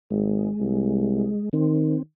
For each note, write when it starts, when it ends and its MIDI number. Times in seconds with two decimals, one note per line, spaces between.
0.11 0.47 32
0.11 1.49 56
0.60 1.28 36
1.53 1.96 51
1.53 2.03 60